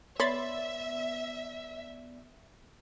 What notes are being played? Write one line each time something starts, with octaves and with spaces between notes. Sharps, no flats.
B3 C#5 D5 E5 B5 C6 A6